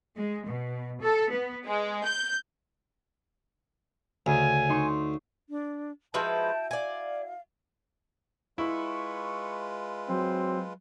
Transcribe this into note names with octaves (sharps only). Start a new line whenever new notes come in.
G#3
B2
A4
B3
G#3
G6
D2 C#3 G#5
D#4 C6 C#6
D4
F3 G#3 E4 F#4 B4 G5 A5 G6
D5 F5 G#5
G#3 E4 F4 B4 C#6
F#3 C4